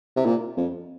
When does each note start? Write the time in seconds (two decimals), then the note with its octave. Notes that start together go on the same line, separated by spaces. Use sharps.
0.16 C3
0.25 A#2
0.57 F2